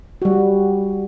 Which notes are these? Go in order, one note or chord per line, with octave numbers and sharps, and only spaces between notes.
G3 F#4